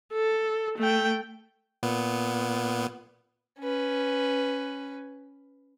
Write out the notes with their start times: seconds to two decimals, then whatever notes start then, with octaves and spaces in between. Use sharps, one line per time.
0.13 A4
0.79 A3 G5
1.83 A#2 B3
3.60 C#4 B4